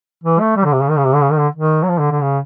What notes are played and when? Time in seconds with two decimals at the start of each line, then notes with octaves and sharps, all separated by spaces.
0.24 E3
0.40 A3
0.56 G3
0.65 D3
0.73 C3
0.81 C#3
0.90 D#3
0.98 C#3
1.06 C3
1.15 D3
1.22 C#3
1.31 D#3
1.39 D3
1.55 D#3
1.83 F#3
1.89 F3
1.99 D3
2.11 D3
2.22 C#3